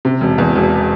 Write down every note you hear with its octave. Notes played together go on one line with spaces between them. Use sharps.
C3
E1
E2
E1